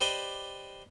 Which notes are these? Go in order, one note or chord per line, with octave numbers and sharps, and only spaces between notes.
G4 B4 C5 D5 D#5 G5